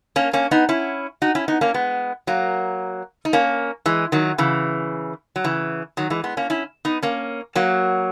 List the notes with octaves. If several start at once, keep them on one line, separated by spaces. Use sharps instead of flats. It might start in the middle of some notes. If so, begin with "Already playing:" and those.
A#3 C#4
A#3 C#4
B3 D#4
C#4 E4
D#4 F#4
C#4 E4
B3 D#4
A#3 C#4
G#3 B3
F#3 A#3
D#4
A#3 C#4
E3 G#3
D#3 F#3
C#3 E3
F#3
C#3 E3
D#3 F#3
E3 G#3
G#3 B3
A#3 C#4
C#4 E4
B3 D#4
A#3 C#4
F#3 A#3